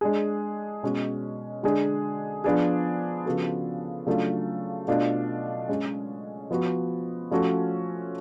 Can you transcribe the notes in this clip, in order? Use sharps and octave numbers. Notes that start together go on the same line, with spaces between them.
G#3 D4 G#4
B2 G#3 C#4 F#4
D3 G#3 D4 G#4
F3 B3 D4 G#4
C#3 F3 B3 F#4 A4
C#3 F#3 A3 D4 F4
B2 A3 D4 F4
G#3 C#4 G#4
F3 B3 F#4
F3 A3 C#4 F#4 A4